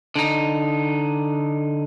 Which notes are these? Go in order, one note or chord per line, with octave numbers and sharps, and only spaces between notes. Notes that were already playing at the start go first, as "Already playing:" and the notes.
D3 D#4